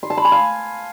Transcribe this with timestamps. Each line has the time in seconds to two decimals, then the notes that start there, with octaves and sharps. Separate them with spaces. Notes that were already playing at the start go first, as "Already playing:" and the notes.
0.03 C6
0.10 A5
0.17 B5
0.25 G#5
0.32 F5